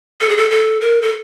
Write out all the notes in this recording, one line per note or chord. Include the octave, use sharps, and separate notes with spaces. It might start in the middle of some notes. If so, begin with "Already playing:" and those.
A4
G#4
A4
A4
A#4
A4